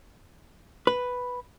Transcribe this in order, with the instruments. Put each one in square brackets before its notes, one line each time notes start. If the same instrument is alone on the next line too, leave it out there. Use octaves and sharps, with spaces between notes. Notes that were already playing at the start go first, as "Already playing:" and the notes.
[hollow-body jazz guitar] B4